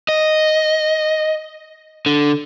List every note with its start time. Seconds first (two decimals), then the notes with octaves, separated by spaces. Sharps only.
0.09 D#5
2.06 D3